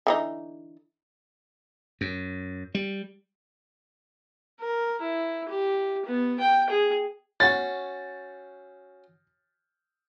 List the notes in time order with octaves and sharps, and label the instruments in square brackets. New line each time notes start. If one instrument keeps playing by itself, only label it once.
[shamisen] D3 E3 D#4
[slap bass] F#2
G3
[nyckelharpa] A#4
E4
G4
B3
G5
G#4
[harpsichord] C#4 F#4 [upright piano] A6